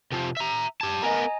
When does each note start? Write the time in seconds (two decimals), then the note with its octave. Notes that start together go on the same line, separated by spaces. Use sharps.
0.12 C3 F3
0.37 E5 A#5
0.81 G4 A5 G#6
1.02 B3 A#4 D#5 G#5 A#5